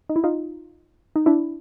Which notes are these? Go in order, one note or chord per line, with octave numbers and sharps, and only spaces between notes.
D#4
E4
D#4 F4
D#4
D4 E4